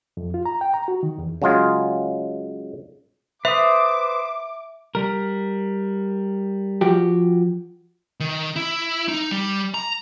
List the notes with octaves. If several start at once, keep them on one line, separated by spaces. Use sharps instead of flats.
F2
F4
A#5
G5
A#5
F#4
D#3
E2
C#3 F#3 G#3 F4 G#4
B4 C5 E5 D6 D#6
G3 A#4
F3 F#4 G4
D#3
E4
D#4
G3
A#5